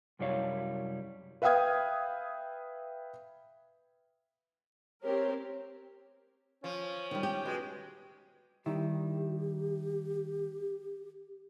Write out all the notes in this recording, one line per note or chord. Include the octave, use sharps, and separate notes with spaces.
C2 F#2 G3 E4 C#5 F5
B4 E5 F5 G5 D#6 G#6
C4 G4 A#4 C#5
F3 C#4
D#3 G3
G4
B2 G#3
D#3 G3 E4 G4